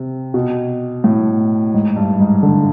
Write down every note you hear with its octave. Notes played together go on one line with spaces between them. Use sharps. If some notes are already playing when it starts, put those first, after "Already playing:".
Already playing: C3
B2
A2
G#2
G2
G#2
D3